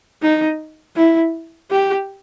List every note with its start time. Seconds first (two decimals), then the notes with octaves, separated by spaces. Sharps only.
0.23 D#4
0.96 E4
1.71 G4